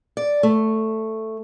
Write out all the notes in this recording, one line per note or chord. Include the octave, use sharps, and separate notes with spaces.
D5
A3